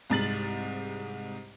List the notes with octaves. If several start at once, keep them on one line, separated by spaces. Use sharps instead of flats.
C2 G#2 A6 F#7